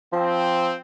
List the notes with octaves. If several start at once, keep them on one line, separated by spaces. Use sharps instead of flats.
F3 C4